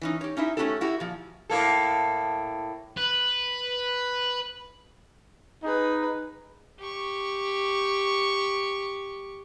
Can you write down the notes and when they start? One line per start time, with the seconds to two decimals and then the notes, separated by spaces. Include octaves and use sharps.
0.01 E3 C#4 D#4
0.21 G4 C#5
0.37 C#4 D#4 E4 E5
0.57 A3 C#4 E4 F#4 G4 A4
0.81 E4 F#4 G4
1.00 A#2 F3
1.50 A2 A#3 A4
2.97 B4
5.63 D#4 G#4 B4
6.79 G4 C#6